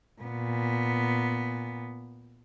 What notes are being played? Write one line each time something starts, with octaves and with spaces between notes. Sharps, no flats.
A#2 B3